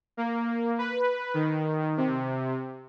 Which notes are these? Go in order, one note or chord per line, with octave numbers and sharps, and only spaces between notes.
A#3
B4
D#3
C3